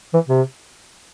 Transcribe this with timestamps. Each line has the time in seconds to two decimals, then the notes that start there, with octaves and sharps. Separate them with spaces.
0.14 E3
0.28 C3